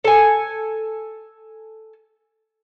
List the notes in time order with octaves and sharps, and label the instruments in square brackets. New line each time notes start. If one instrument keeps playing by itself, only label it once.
[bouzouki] A4 G#5